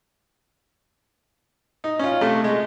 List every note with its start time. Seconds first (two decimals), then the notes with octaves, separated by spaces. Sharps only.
1.84 D#4
1.99 C#4 F4
2.21 C3 A3
2.44 G#3